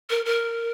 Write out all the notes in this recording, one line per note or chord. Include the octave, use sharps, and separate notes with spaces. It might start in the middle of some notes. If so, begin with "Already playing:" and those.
A#4
A#4